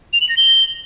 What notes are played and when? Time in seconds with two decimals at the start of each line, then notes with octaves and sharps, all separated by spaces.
0.13 F7
0.21 F#7
0.29 A#6
0.37 G7